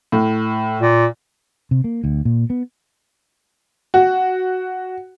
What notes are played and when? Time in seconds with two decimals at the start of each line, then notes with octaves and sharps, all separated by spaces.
0.12 A2
0.81 A#2
1.71 C3
1.84 A#3
2.04 D2
2.25 A#2
2.50 B3
3.94 F#4